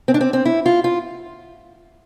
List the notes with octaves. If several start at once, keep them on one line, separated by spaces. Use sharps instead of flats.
C4
D4
C4
C4
E4
F4
F4